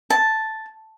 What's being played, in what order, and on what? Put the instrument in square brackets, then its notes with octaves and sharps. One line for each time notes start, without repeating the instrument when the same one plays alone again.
[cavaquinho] A5